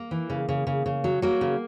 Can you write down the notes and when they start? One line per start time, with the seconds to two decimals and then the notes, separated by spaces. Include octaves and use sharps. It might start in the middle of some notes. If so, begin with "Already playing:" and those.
Already playing: A#3
0.11 E3
0.30 C#3
0.49 C#3
0.67 C#3
0.86 C#3
1.04 F#3
1.22 F#3 A#3
1.41 C#3